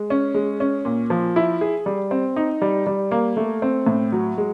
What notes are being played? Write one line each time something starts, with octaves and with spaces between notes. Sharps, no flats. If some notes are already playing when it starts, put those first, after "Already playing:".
Already playing: G#3
C#4
G#3
C#4
A#2
F3
E4
G#4
G3
C4
D#4
G3
G3
A#3
A3
C4
A2
F#3
G#3